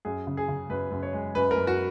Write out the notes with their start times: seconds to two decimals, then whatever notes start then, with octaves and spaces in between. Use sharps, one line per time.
0.05 F#2 G#4
0.27 C#3
0.37 G#4
0.48 C#3
0.70 F#2 B4
0.91 F#2
1.03 C#5
1.13 G#3
1.35 F#2 B4
1.51 A#4
1.57 F#2
1.67 F#4